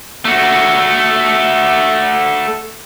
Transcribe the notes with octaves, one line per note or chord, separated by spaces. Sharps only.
A3 F#4